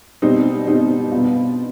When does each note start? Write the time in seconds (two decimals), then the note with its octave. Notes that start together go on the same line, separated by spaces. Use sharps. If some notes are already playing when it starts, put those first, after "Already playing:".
0.22 B2 G3 C4 D#4
0.67 B2 G3 C4 D#4
1.12 B2 B3 D4 F4